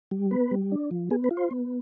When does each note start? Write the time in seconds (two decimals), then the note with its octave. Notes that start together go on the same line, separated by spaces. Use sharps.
0.11 G3
0.31 B3 B4
0.51 G3
0.72 D4
0.91 F3
1.11 B3 G#4
1.24 B4
1.31 F4
1.37 C5
1.51 B3